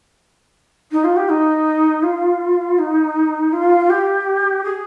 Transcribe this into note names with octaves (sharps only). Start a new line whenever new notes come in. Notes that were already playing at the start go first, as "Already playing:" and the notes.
D#4
F4
G4
D#4
F4
D#4
F4
G4
G#4